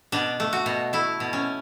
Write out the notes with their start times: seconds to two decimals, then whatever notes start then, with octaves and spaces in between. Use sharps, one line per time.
0.12 B2 D4
0.40 A3
0.53 F#4
0.66 B2
0.93 A3 E4
1.20 B2
1.33 C#4